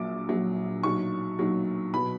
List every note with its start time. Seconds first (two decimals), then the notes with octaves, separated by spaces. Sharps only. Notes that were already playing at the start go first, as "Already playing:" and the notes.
Already playing: A#1 A#2 F#3 D6
0.29 A#1 A#2 F#3
0.83 B1 A#2 F#3 C#6
1.39 B1 A#2 F#3
1.94 B2 F#3 B5